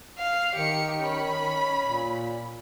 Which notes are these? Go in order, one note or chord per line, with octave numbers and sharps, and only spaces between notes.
F5
D#3 G4 C#7
C#4 B5
A#2